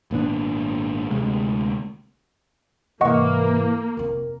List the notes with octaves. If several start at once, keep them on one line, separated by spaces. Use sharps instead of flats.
G#1 A#2 B3 D4
D2 C3 G#3
G#2 C3 E3 A#3 D#5 F#5 C#6
F1 C4 A#4